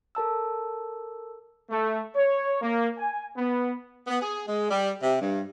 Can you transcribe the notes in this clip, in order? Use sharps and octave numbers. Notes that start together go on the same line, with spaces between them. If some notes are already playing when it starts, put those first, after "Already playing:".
A4 A#4 A5 E6
A3
C#5
A#3
G#5
B3
B3
G#4
G#3
G3
C3
G2